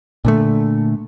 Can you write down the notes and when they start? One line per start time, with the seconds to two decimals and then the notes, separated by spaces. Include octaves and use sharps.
0.25 A#2 D3 A3